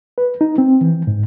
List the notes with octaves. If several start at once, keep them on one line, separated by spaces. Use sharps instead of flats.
B4
D#4
C4
E3
G#2